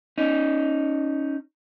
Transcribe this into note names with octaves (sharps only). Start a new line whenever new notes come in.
C#4 D#4